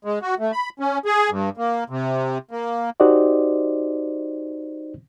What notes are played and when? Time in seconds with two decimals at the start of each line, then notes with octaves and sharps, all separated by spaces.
0.05 G#3
0.22 F#4
0.39 A3
0.52 B5
0.80 C#4
1.05 G#4
1.30 G2
1.57 A#3
1.90 C3
2.51 A#3
3.00 D#4 F#4 G4 C5 D5 D#5